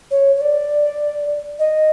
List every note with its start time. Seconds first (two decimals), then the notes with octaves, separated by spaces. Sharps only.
0.11 C#5
0.36 C#5
0.41 D5
1.59 D#5